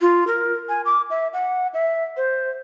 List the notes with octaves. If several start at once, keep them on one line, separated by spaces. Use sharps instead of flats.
F4
A#4
G#5
D6
E5
F#5
E5
C5